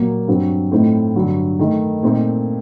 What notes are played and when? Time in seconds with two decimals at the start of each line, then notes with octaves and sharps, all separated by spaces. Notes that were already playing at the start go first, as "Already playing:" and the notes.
Already playing: A#2 F#3 A#3
0.28 G2 F#3 C4
0.72 A2 A3 C4 D#4
1.16 G2 D3 F#3
1.59 D#3 A3 D#4
2.03 A#2 A3 C4 D#4